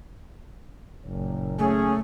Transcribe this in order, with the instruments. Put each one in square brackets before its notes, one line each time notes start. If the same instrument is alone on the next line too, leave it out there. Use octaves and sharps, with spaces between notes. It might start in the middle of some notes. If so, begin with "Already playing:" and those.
[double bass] F#1 A#2
[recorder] A3 [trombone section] C#4 G#4